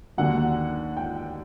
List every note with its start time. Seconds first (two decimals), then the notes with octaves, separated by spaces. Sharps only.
0.17 D#2 D3 F#3 F#5
0.97 G5